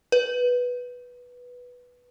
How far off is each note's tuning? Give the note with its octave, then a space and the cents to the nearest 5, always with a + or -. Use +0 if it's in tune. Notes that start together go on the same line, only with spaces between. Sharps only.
B4 -5